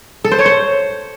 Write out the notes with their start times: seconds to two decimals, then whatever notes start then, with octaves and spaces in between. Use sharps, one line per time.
0.24 A4
0.32 C5
0.39 C#5
0.46 C5